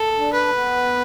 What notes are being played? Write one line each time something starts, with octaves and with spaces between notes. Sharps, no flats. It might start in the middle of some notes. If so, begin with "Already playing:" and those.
Already playing: A4
D4
B4
B3